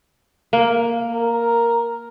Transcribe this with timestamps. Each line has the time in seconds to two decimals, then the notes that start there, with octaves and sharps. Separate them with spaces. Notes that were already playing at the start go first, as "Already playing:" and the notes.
0.53 A#3
1.13 A#4